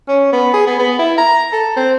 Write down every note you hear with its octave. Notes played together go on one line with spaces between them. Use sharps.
C#4
B3
G#4
B3
B3
E4
A#5
A4
C4